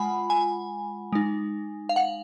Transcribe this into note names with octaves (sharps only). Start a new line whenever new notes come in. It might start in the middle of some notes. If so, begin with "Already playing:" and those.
Already playing: G#3 F4 F#5 G#5 B5
G#5
G#3 D#4
F5
F#5